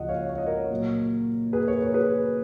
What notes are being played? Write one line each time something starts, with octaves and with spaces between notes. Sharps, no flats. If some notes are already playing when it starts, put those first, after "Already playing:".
Already playing: C#2 F3 D#5 F#5
C#5 F5
C#5
D#5
A#4 C#5
A#2 F#3
G#4 B4
A#4 C#5
A#4 C#5
G#4 B4